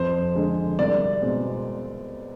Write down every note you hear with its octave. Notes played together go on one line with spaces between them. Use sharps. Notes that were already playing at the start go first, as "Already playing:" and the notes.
Already playing: F2 C5
D3 G#3
C2 D5
B2 G#3 C4